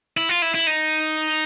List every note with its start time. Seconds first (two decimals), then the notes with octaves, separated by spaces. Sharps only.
0.17 E4
0.29 F4
0.42 E4
0.54 E4
0.67 D#4